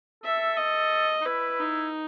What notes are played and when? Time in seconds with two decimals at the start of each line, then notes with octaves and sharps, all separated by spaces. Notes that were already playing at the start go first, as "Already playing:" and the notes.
0.24 A4 E5
0.57 D#5
1.21 D#4
1.25 E4 B4
1.60 D#4